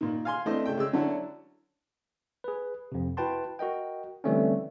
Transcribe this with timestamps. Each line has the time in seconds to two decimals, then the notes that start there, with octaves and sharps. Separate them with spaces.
0.01 A#2 D#3
0.25 F5 G#5 C6
0.46 E3 A3 C4 D4 C5 D#5
0.65 C#3 A3 G5
0.77 C#3 G#3 E6
0.93 D3 F#3 C#4 D4 E4 F#4
2.44 G#4 B4
2.92 F2 C3
3.17 E4 F#4 B4 G5 A5 C6
3.59 F#4 A#4 D#5 G5
4.24 D3 E3 G3 A3 C4 C#4